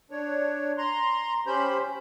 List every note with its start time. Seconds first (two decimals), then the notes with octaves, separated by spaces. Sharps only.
0.11 D4 C#5
0.78 A#5 C6
1.47 C#4 G4 C5 B5 G6